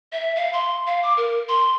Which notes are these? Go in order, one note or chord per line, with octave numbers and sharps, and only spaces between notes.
E5
F5
C6
F5
D6
A#4
C6